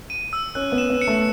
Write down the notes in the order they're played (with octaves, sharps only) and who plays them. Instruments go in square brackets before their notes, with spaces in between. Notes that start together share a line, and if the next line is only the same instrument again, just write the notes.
[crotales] D#7
E6
[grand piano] C#4 [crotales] F#6
[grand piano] B3
[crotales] E7
[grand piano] B3
[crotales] C#7
[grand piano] A3